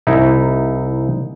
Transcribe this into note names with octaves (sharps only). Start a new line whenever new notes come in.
C2 D#4 E4